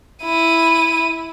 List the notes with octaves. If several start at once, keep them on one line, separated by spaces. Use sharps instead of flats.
E4 D#7